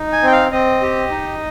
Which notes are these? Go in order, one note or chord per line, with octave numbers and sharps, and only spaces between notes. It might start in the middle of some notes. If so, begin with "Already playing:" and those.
Already playing: D#4
G#5
C4 G5
F5
C4 D#5
G4
D#4